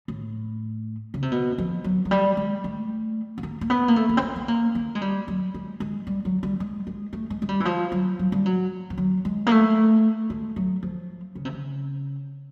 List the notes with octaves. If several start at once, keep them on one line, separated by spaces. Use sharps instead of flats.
A2
C#3
C3
B2
F3
F#3
F#3
G3
G#3
A3
B3
A#3
A#3
B3
A#3
A3
A#3
C4
B3
B3
A#3
A#3
G#3
G3
F#3
G#3
G#3
G3
F#3
G3
G#3
G#3
A3
G#3
G#3
G3
E3
F3
F#3
F#3
G3
F#3
F3
F#3
G#3
A#3
A3
G#3
F#3
F3
C#3
C3
C#3